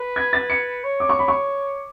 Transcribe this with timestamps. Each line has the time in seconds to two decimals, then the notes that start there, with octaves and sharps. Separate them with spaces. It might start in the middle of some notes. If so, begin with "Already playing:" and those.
Already playing: B4
0.16 G#6
0.33 A6
0.50 C#7
0.84 C#5
1.00 D6
1.09 C#6
1.19 B5
1.28 C#6